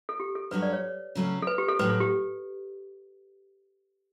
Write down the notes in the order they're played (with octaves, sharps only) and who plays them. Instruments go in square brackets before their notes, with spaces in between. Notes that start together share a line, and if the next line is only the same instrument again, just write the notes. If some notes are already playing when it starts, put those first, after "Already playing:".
[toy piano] A4
G4
A4
[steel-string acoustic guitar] G2 F#3 C#4 F#4 A4 [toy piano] B4
[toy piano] D5
C#5
[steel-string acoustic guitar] C#3 F#3 A3 C#4
[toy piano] A4
B4
G4
A4
[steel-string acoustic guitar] A2 F#3 C#4 [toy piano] B4
[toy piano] A4
G4